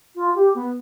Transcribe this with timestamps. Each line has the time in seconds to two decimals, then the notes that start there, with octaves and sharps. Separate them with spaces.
0.14 F4
0.34 G4
0.54 B3